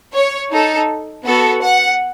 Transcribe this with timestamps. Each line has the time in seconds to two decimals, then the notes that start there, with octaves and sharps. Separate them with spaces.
0.14 C#5
0.52 D#4 A4
1.25 B3 F#4 A4
1.63 F#5